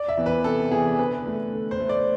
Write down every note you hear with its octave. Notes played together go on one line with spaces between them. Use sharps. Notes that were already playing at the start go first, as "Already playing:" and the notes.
Already playing: D5
E5
E3 B3
B4
C3 A4
E3 B3 G#4
D3 B4
A3
D3
C5
A3
D5